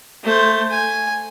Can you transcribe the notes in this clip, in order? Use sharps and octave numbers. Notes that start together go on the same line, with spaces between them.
A3 C5
G#5